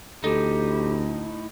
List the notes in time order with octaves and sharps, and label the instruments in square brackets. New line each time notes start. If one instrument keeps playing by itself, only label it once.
[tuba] D2 [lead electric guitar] A2 D#4 [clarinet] G4 [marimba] A4